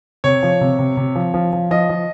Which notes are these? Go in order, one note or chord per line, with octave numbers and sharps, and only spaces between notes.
C3 C#5
F3
C3
C3
C3
F3
F3
F3
F3 D#5
F3